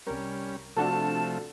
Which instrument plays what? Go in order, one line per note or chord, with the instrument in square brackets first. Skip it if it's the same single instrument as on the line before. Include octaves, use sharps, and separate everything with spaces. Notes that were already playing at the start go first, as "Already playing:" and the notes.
[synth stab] C2 A#4 [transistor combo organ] G3 C#4
[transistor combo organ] C3 F3 A3 [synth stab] D4 F#4 A4 [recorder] A5